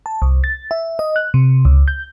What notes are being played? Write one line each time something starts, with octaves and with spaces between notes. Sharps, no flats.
A5
C2
A6
E5
D#5
F#6
C3
C#2
G6